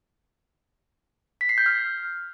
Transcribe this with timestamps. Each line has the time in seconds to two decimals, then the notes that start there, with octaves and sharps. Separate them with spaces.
1.41 B6
1.49 C7
1.58 G6
1.66 F6